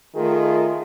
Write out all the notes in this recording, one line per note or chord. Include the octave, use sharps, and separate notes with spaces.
D#3 A3 F4 G#4